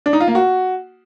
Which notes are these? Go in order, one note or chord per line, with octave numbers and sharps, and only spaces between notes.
D4
D#4
F4
A#3
F#4